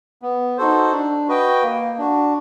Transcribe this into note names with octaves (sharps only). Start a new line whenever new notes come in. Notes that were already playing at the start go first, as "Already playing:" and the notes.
B3
D#4 F#4 A4 C5
D4
F#4 B4 D#5 G5
A#3
D4 F#4